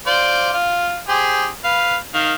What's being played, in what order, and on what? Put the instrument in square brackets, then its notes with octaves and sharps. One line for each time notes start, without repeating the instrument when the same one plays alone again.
[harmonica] F4 C5 D5
F4
G4 G#4 C5
B4 F5
D#3 F5